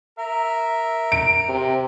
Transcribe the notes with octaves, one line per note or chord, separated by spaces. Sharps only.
A#4 E5
D7
C3